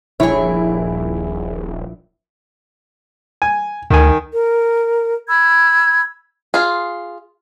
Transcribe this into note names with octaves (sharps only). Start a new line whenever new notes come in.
D#1 A#1 E4 G#4 C#5
G#5
D2 D#3 G#5
A#4
B5 E6 G#6
F4 G#4